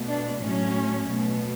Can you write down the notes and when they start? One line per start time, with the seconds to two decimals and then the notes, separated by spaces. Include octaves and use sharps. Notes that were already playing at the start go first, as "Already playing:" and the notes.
Already playing: B2 A3
0.08 D4
0.41 A2 F#3 A3 C#4
1.07 B2 A3